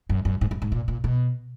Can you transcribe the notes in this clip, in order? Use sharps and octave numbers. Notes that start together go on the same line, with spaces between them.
F#2
F#2
G#2
F#2
G#2
A#2
A#2
B2